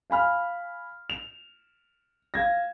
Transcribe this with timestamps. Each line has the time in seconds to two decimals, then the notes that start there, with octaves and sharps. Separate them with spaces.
0.10 F5 G#5 B5 F6
1.10 F7
2.34 F5 G#6 A#6